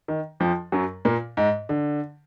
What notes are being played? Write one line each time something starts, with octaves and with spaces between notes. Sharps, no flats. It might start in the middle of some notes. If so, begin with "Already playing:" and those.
D#3
F2 F3
F#2 F#3
A#2 A#3
G#2 G#3
D3